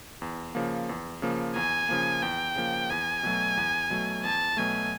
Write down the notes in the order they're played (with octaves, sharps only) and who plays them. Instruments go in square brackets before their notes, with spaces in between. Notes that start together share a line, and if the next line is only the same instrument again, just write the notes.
[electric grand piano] E2
C#3 F3 A#3
E2
C#3 F3 A#3
[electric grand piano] E2 [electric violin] G#5
[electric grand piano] C#3 F3 A#3
[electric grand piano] E2 [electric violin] G5
[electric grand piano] C#3 F3 A#3
[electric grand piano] E2 [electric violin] G#5
[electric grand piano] B2 F#3 A3
E2
B2 F#3 A3
[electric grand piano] E2 [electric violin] A5
[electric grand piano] B2 F#3 A3 [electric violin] G#5